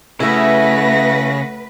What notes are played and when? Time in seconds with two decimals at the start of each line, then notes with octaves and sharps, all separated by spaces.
0.20 C#3 A3 E4 F#4 B4 E5 A#6